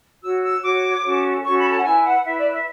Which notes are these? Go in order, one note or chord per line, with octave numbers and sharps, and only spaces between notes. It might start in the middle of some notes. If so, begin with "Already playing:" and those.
F#4 C#5 E6
E6
F#4 C#5 D6
C#4 F#4 A4 C#5
C#4 F#4 A4 C#5 C#6
B5
A5
F#5
E4 B4 G#5
F#5
E4 B4 E5
D5
E5